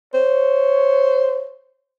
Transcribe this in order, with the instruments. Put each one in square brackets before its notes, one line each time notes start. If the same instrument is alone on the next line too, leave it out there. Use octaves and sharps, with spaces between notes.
[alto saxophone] C5 [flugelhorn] C#5